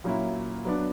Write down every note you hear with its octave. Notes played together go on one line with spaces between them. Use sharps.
A#2 F#3 A#3 C#4 E4
F#3 B3 D4